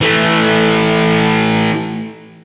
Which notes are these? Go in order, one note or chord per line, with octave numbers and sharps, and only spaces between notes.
E3 A3